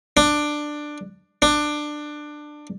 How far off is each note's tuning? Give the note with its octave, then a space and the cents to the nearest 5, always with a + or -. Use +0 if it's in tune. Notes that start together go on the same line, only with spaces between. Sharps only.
D4 +15
D4 +20